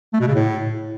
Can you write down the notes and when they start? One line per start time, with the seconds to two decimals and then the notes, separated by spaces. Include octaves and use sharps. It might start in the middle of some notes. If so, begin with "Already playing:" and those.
0.13 A3
0.20 B2
0.28 C#3
0.35 A2